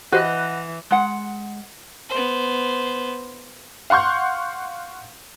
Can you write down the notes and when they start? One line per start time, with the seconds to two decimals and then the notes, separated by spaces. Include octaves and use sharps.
0.13 E3 F#4 G4 B4 C5 D#5 F#5 F#6
0.90 G#3 F#5
2.10 B3 C5
3.90 F5 F#5 C6 C#6 G6